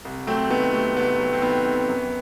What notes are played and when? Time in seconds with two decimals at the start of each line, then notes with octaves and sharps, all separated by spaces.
0.05 C2
0.27 F#3 A3 C4
0.50 D#3 B3
0.73 C3 A3
0.96 C2 B3
1.19 F#3
1.33 C4
1.42 D#3 B3
1.65 C3
1.88 F#2